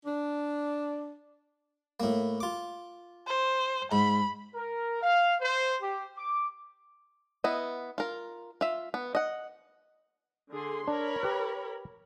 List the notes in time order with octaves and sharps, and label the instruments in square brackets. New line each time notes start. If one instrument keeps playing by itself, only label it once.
[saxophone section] D4
[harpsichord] A2 A#3
F4 D6
[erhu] C5
[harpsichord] G#2 [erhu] B5
[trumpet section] A#4
F5
C5
G4
D6
[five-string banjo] B3 E4 D#5
F4 A#4
F4 E5
B3
D#5 F#5
[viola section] D3 G#4 C6
[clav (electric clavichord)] D4 [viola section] A#4 C#5 B5
[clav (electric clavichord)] G4 B4